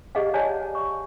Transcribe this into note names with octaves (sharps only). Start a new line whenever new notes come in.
G4 G#4 D#5 F5 F#5
C#5 D5 F5 G#5 A5
C#6